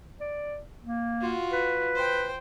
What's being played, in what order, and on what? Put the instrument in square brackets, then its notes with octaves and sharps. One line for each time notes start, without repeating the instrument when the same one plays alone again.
[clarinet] D5
A#3
[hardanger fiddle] F4 F#4
[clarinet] B4
[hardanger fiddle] C5 G5